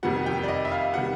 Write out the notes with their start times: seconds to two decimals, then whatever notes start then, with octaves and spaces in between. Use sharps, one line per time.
0.03 F2 C3 D#3 G3 F#5
0.26 G5
0.43 D5
0.48 D#5
0.65 E5
0.72 F5
0.94 C3 D#3 G3 F#5